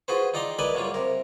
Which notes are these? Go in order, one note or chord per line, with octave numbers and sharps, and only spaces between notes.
F4 F#4 G#4 B4 C5
D#4 F4 D5 G5 A#5 C6
A#4 B4 D5 D#5 G#5 B5
F#2 C#3 G3 A#3 F4
C3 A#4